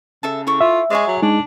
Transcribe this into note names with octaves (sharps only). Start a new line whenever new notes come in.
C#3 A4 E5 A5
E4 A4 C#6
F4 E5
G#3 G#4 C#5 D5
F#3
G#3 D4 D#4